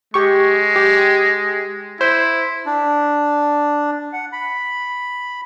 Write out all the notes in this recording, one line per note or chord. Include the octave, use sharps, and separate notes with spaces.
G#3 G4 C#6
G4
E4 C5
D4
F#5
B5